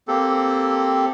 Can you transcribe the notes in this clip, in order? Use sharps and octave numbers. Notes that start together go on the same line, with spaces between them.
A#3 C4 G4 A4